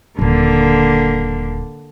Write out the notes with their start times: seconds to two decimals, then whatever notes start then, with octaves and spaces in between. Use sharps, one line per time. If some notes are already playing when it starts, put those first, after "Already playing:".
0.19 D#1 D3 D#3 A#3